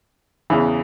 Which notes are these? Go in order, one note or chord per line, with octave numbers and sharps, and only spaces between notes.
E2 C#3 E3